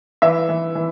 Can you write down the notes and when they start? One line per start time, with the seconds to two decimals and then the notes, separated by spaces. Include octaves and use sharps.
0.22 E3 E5
0.49 E3
0.75 E3